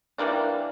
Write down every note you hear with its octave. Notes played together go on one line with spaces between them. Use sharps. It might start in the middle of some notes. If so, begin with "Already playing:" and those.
E3 G3 A#3 D4